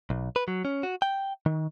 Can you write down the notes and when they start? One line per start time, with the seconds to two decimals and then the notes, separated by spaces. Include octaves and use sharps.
0.10 B1
0.36 B4
0.48 F#3
0.65 C#4
0.83 F#4
1.02 G5
1.46 D#3